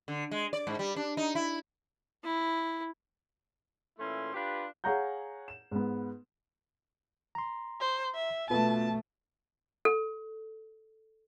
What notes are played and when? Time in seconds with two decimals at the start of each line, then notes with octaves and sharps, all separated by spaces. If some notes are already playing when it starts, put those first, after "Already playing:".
0.08 D3
0.31 G#3
0.53 D5
0.67 G#2
0.79 G3
0.96 D4
1.17 D#4
1.35 E4
2.24 E4
3.99 A#2 E3 A3 C#4 E4 C6
4.34 D4 F4 G4 B4
4.84 G#4 C#5 F5 F#5 A#5 G6
5.48 E7
5.71 G#2 B3
7.35 A#5 C6
7.80 C5
8.15 E5
8.50 B2 A3 B3 F4 B4 A5
9.85 A4